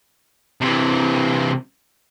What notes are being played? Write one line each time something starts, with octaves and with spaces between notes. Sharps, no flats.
C3 E3